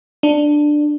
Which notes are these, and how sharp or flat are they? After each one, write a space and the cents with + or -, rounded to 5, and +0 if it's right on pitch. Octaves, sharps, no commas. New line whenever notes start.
D4 +10